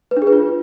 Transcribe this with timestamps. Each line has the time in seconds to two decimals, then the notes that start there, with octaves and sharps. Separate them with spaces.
0.11 B4
0.17 D4
0.22 G#4
0.27 B4
0.32 F4